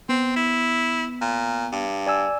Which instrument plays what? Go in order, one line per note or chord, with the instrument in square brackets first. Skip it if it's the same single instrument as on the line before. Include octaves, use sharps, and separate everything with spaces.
[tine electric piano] B3 [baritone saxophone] C4
[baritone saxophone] E4
A#2
G2
[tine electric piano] D5 G#5 E6